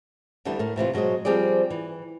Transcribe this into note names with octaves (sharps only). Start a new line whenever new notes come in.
D2 D3 E3 G3 A5
A2 A#4
A2 C3 E3 F4
B2 F#3 G#3 C5 D#5
F3 G3 C4 G#4 D5
E3